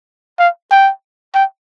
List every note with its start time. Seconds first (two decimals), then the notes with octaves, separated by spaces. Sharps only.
0.39 F5
0.71 G5
1.34 G5